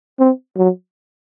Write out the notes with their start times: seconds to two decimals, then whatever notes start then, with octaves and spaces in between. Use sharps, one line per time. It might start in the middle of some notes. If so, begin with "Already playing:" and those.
0.19 C4
0.57 F#3